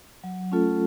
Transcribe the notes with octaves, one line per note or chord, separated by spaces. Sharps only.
F#3
A3 C#4 F4 A4